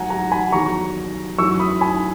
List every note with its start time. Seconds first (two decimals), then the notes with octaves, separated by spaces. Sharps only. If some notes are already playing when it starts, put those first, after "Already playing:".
Already playing: G#2 F#3 F#5 G#5 A#5
0.10 F#5 A#5
0.32 G#5 B5
0.52 E2 D#3 F#3 A#5 C#6
1.38 F#2 E3 C#6 E6
1.60 B5 D#6
1.81 G#5 B5